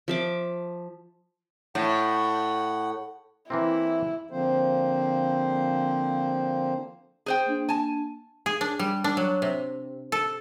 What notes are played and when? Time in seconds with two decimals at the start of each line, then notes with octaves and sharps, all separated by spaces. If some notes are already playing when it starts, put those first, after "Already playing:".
0.08 F3 E5 D6
1.75 A2 F#5
3.50 E3 A#3 C4 E4
4.31 D3 F3 A#3 C4 C5
7.26 G#4 C5 G5
7.46 A#3 D4
7.69 G#5 A5
8.46 G#4
8.61 D4
8.79 G3
9.04 D4
9.17 F#3
9.42 C3
10.12 A4